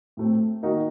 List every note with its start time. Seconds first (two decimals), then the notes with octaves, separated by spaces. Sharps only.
0.17 A2 A3 C4
0.63 D#3 A#3 D#4 F#4